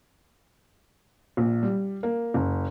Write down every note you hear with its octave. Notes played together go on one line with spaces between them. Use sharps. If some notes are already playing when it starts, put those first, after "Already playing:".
A#1
G3
A#3
F#1